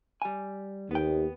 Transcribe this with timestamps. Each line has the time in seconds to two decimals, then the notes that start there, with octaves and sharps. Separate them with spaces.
0.22 G3 G#5
0.91 D#2 B3 G5